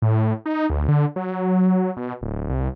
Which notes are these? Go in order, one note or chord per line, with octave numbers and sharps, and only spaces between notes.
A2
D#4
D2
D3
F#3
B2
D1
C2